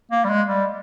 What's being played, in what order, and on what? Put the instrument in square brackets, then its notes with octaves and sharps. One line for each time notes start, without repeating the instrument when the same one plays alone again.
[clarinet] A#3
G3
G#3
G3